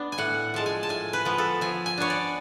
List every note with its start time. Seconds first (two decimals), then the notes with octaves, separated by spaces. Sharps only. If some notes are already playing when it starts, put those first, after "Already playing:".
Already playing: B3 D4
0.12 G#5
0.18 A2 F#5
0.54 F3 G#3 A5
0.66 G#5
0.83 A5
0.89 A2 G#5
1.13 B4
1.25 F3 B3
1.38 A4
1.61 F3 G#5
1.86 G#5
1.97 B3 D4 C#5
2.10 D5